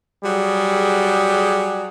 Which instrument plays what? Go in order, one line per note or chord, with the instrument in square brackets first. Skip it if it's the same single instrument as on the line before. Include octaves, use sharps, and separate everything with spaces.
[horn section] F#3 G3 G#4